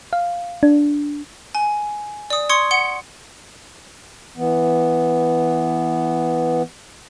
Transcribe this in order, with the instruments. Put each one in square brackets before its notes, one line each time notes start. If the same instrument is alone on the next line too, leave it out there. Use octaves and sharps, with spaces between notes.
[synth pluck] F5
D4
[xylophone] G#5
D5 D#6
C6 C#6 D#6 G#6 C#7
F#5 C#7 G7
[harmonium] E3 B3